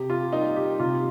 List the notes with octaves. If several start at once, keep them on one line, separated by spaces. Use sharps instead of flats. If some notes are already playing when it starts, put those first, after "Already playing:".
Already playing: C3 G4
F4
G3 A#3 D#4
G4
C3 F4